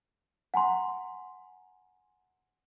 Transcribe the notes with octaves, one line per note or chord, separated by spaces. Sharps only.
F#5 G#5 A#5 C6